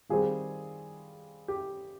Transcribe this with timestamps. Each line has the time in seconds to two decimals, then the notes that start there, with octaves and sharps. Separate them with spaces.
0.09 D#3 G3 C4 F4 G#4
1.48 G4